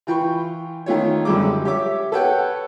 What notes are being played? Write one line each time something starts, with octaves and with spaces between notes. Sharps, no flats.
E3 F4 G5 B5 C#6
D#3 A3 F4 C#5
F#2 D3 F3 G3 G#3 D6
G4 C#5 E5 D6
A4 B4 C#5 F#5 G5